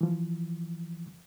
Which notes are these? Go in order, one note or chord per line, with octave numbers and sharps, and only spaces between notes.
E3 F3